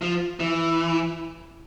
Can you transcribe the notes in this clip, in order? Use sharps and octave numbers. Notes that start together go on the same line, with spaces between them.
F3
E3